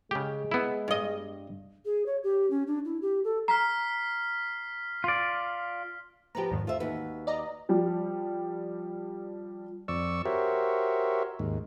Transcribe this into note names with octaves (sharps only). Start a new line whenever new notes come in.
C#3 G#3 G4
B3 E4
G2 D#5
G#4
C#5
G4
C#4
D4
E4
G4
A4
A#5 F6 B6 C7
F4 D5
F3 B3 G4 B4 A#5
E2 G#2 D#3
F4 C5 E5
D#2 F#4 B4
D5 D#5 A#5
F3 G3
F2 D5 C#6 E6
F#4 G4 A#4 C5 C#5 E5
D#2 G#2